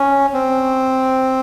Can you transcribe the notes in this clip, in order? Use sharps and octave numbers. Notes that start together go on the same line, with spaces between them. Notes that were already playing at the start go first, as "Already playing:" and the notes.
Already playing: C#4
C4